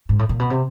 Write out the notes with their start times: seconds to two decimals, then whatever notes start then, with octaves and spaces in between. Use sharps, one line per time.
0.09 G#2
0.19 A2
0.29 A#2
0.39 B2
0.50 C3